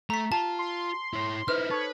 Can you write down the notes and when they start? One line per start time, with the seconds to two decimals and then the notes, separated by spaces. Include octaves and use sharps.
0.10 A3 A#5 C#6 B6
0.32 F4 G4 A5
0.59 C6
1.14 E4 C#5
1.48 D#4 E4 A4 B4 C5 F6
1.70 D#4 A4 B4 C#5